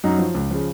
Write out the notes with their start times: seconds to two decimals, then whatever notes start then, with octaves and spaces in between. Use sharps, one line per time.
0.04 F#2 D#4 F#4
0.19 F3
0.34 C#2
0.50 C#3 F3